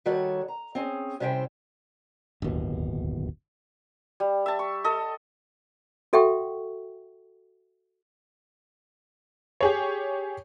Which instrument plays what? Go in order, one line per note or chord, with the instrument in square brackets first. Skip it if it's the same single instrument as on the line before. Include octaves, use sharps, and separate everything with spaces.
[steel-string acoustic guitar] D#3 G3 F#4 A4 C#5
A#5
C4 C#4 G#4
C3 G3 C#4 E4 C5 G5
[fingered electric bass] D1 G1 D#2 B2
[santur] G3
E5 A5
C#6
A4 D#5
[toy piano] F#4 A4 E5 F#5 G5 C#6
[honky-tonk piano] G4 G#4 C#5